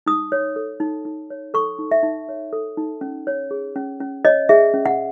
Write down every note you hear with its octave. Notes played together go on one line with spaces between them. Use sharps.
D#4 D#6
C#5
A4
D#4
D#4
C#5
A4 C#6
D#4
E5
D#4
C#5
A4
D#4
C#4
C#5
G#4
C#4
C#4
C#5 D#5
G#4 E5
C#4
F#5